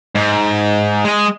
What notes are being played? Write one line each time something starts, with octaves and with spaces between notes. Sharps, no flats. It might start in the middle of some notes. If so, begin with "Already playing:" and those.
G#2
G#3 D#5